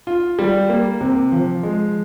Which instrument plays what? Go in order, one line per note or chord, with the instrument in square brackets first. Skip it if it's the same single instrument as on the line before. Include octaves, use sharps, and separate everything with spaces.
[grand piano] F4
G3
A#3
C3
F3
G#3